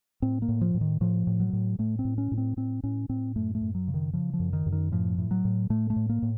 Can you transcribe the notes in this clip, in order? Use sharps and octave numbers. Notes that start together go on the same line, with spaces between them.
A2 C4
A#3
A2
F3
A2
D#3
A2 F3
A2
F#3
A2
A2 A3
C4
A2
C#4
A2
C4
A2 C4
A2 C#4
A2 C4
F#2 A3
A3
F#2
F#3
C#3
D#3
C#3 F3
F3
F#2
D#3
F#2
D#3
A2 F3
A2
F#3
A2
A2 A3
A3
A2
A#3
A2